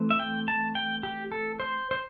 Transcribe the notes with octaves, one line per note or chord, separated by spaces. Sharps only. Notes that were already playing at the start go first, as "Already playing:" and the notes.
Already playing: E3 A3 C4
E5
G5
A5
G5
G4
A4
C5
C5